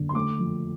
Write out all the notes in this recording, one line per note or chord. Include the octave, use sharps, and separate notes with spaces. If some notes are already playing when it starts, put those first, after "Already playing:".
Already playing: D3
C6
A3 D6
F3